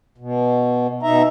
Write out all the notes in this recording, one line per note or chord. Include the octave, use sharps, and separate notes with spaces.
B2
B2 D#4 E5 A#5